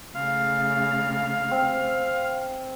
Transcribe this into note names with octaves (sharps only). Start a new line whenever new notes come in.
C#3 A3 F5
C4